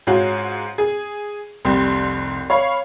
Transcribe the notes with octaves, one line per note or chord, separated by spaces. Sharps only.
G#2 C#4 F4 F#4
G#4
F1 C2 G3 C6
C#5 F5 B5 C#6